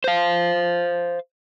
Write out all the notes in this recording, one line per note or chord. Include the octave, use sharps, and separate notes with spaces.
C5 F5